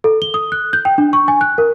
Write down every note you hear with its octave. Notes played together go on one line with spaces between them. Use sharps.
A4
G7
D#6
F#6
G6
G5
D4
C#6
G#5
F#6
A#4